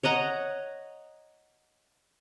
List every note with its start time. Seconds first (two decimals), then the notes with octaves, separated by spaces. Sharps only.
0.03 C#5 D#5 F#5 A#5